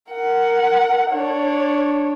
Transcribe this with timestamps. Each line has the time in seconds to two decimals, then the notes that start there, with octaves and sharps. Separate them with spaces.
0.12 A#4 F#5
1.11 D4 C#5